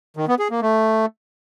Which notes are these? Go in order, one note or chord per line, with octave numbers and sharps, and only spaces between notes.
D#3
B3
G#4
A#3
A3